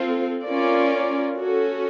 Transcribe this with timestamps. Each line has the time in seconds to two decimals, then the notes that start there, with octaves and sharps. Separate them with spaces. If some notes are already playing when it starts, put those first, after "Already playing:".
Already playing: C4 F4 A4
0.44 C#4 F4 A#4 D5
1.40 C#4 F#4 A4